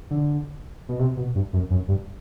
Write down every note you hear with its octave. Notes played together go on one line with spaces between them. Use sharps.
D3
B2
C3
B2
G2
F#2
F#2
G2